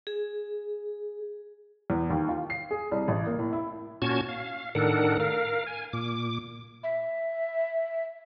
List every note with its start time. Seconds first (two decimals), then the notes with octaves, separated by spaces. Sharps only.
0.07 G#4
1.90 E2
2.10 D#2
2.29 F4
2.50 C7
2.71 G#4
2.91 C2
3.08 A1
3.26 A#3
3.39 A2
3.53 E4
4.02 A#2 C#4 F#4 A5 G#6
4.29 F5
4.75 A2 D#3 D4 A4 A#4 F#5
5.20 A#4 F5
5.66 G#5
5.93 A#2 D6
6.83 E5